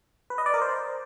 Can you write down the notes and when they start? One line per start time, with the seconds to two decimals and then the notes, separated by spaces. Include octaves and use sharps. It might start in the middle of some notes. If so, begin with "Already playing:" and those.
0.30 B4
0.38 D#5
0.46 D5
0.54 A#4
0.62 C5